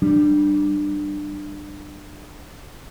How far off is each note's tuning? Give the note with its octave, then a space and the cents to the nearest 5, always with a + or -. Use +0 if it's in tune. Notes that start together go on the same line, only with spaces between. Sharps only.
G3 -10 D4 +25